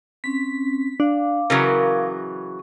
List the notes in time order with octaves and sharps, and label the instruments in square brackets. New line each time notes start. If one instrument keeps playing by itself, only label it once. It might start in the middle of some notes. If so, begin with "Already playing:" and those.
[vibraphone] C4 C#4 [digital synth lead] B6
[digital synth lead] D4 [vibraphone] F5 D6
[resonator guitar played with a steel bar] C#3 E3 F#3 [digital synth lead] A#4